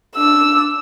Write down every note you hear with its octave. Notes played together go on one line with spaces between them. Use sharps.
D4 E6